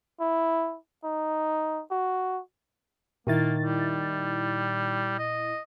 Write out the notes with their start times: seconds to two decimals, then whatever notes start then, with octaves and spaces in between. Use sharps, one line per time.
0.21 E4
1.04 D#4
1.91 F#4
3.27 A#2 D#3 A#3 E4 A6
3.62 G3
5.18 D#5